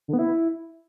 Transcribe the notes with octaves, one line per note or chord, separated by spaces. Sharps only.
D3
B3
E4